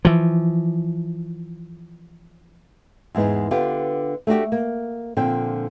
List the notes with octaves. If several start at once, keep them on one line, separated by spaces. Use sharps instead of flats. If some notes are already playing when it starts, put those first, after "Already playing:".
E3 F3
E2 G#2 G#3 B3
D3 B3 F4 G4
A3 D4 F#4 G4
A#3
A#2 D3 F3 C4 G5